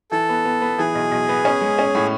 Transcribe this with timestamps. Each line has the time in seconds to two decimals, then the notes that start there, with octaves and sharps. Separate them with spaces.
0.11 E3 A4
0.29 B3
0.45 B3
0.62 B3
0.78 E3 G#4
0.95 B1
1.11 B1
1.29 B3
1.45 C#4
1.61 G#3
1.79 C#4
1.95 A2